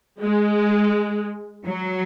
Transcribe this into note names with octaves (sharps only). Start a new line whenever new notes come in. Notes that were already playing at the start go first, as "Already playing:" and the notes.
G#3
F#3